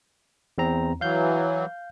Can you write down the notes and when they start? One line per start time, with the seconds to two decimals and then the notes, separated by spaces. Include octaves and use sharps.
0.58 E2 C4 A#5
1.01 E3 F#3 F5 G6